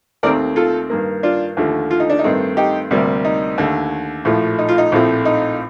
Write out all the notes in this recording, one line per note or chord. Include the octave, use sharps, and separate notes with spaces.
D#2 D#3 A3 C4 A#4 D5
F4 A4
G2 D#3 A#3
D4 F4
D#2 D3 F3 A3
F4
D#4
D4
D#4
G2 D#3 A3 C4
D#4 G4
D2 C3 G3 A#3
D#4
D#2 D3 A3
A#1 A2 F3 A3
D#4
F4
D#4
A#1 A2 F3 A3 C4
D#4